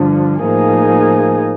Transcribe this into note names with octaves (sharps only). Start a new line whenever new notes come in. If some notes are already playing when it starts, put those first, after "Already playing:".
Already playing: G2 D3 F3
A2 F3 A#3 D#4 G#4